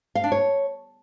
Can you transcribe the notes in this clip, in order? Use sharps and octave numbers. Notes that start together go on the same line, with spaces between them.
F5
D4
C#5